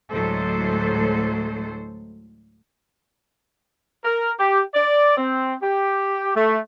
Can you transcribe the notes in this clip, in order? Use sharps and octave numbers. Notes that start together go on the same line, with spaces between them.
D2 A2 F#3 G#3 A4 C5
A#4
G4
D5
C4
G4
A3